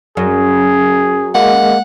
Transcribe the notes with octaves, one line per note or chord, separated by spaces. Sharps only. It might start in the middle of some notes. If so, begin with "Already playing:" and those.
F#2 G#4
G#3 A#3 F#5